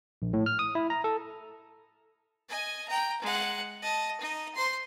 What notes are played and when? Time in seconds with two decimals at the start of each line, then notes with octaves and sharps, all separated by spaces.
0.22 A#1
0.33 A2
0.46 F6
0.59 D#6
0.75 E4
0.90 A#5
1.04 A4
2.49 D#5 G#5
2.88 G5 A#5
3.21 G#3 F#5
3.82 D#5 A5
4.20 D#4 D#5
4.55 C5 C6